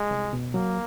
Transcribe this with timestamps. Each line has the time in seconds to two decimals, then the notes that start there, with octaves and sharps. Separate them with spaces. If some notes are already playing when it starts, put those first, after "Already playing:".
Already playing: G#3
0.11 C2
0.33 B2
0.54 F#3 A#3